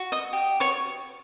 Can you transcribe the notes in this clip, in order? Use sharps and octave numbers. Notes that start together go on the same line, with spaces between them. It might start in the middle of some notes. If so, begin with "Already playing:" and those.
Already playing: F#4
D#5 D#6
G4
C#5 C#6